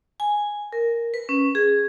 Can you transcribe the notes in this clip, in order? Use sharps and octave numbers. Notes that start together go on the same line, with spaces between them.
G#5
A#4
B4
C#4
G#4